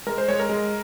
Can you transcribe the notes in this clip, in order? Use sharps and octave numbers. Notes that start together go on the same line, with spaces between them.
G#3 A#4
C5
G#3 C#5
A#4
G#3